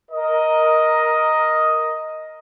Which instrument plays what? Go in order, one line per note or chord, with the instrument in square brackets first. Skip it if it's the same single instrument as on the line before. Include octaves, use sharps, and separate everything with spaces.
[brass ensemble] A#4 D#5